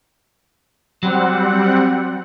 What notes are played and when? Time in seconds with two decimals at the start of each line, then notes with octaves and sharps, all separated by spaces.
1.03 F#3 G3 C4 F#5